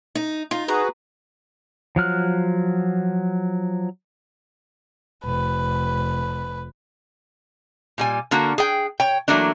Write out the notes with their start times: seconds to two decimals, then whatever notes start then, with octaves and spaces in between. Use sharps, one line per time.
0.15 D#4
0.51 D#4 F4
0.68 F#4 G#4 B4 A#5
1.96 F3 F#3 F6 F#6
5.26 F1 B4
7.98 A#2 G3 G#5
8.31 D3 A#3 F#4
8.58 G#4 G5
9.00 C#5 G5
9.28 E3 F#3 A3 A#3 D4